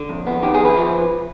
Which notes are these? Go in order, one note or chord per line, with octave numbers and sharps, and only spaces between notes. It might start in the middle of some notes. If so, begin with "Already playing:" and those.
Already playing: D3
F2
B3
D#3 G4
G#4
F2
B4
F3